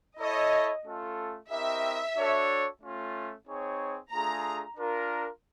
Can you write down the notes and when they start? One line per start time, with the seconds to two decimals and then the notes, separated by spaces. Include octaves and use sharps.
0.20 E4 A4 C#5 D#5
0.85 A3 C#4 F4 A4
1.50 C4 E4 G4 A#4 D#5 E5
2.16 D4 F#4 A4 C#5
2.81 A3 C#4 F4
3.47 C4 D#4 G#4 C#5
4.12 A3 D4 F4 G#4 A#5
4.77 D4 F4 A#4